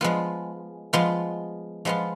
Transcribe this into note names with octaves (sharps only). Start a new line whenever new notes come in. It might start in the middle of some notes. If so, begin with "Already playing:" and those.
F3 G#3 B3 F4
F3 G#3 B3 F4
F3 G#3 B3 F4